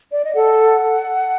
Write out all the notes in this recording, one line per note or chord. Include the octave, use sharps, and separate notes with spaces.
D5
D#5
A4 F#5